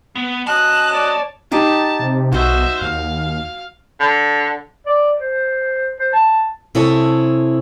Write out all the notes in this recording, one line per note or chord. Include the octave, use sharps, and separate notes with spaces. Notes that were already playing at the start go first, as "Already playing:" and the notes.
B3
F#3 C#4 D#5 A5 F#6
C#5 D5
D#4 G4 G#4 A5
C3
B1 F#4 C5 D#5 E5
D#2 F5
D3
D5
C5
C5
A5
C3 E4 G#4 A4 C#5